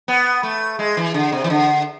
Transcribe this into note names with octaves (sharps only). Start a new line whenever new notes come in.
B3
A3
G#3
E3
D3
C3
E3
D3